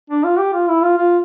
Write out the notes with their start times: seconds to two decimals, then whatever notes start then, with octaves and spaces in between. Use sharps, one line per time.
0.10 D4
0.24 F4
0.38 G4
0.53 F4
0.68 E4
0.83 F4
0.97 F4